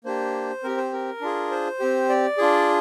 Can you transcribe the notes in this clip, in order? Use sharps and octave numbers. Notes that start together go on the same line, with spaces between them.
A#3 D4 G4 C5
C4 G4 A#4
C5
A#4
D4 F4 G#4
C5
C4 G4
D5
D4 F4 G#4